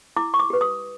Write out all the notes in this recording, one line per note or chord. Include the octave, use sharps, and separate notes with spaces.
E4 D6
C#6
D6
G4 B4
D#6